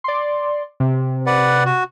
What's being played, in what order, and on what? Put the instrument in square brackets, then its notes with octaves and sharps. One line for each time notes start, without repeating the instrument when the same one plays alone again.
[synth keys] D5 C6
C3
[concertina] B4 D5 F#5
F#4